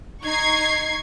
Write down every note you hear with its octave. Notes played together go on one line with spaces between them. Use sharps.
D#4 C#6 G#6 C7